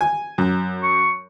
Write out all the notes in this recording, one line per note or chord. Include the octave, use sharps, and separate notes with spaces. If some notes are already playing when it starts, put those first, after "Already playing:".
G#5
F#2
C#6